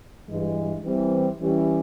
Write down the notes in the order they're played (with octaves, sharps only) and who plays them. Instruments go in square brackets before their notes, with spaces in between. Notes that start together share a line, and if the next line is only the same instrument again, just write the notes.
[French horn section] G2 E3 G#3
E3 G3 C4
E3 G3 C#4 E4 G4